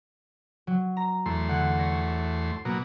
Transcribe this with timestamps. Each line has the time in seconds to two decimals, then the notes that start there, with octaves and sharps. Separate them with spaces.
0.67 F#3
0.97 A#5
1.26 E2 A3 C6
1.49 D3 F#5
1.79 C#5 A#6
2.65 B2 F#3 A#3